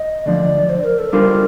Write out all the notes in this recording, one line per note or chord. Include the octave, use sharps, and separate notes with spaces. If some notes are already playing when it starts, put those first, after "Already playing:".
Already playing: D#5
D2 D3 F3 D5
C5
A#4
A4
G3 D4 F4 A#4 C5